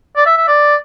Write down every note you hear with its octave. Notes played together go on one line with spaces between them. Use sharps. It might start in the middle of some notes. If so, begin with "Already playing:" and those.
D5
E5
E5
D5